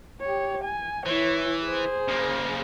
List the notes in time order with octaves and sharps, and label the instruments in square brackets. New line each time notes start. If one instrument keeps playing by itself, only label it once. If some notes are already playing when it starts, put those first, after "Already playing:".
[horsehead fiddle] G4 C#5
G#5
[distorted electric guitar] E3 [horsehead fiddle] E4 C#5
[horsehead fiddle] G#4 C5
[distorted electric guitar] C#3 A#3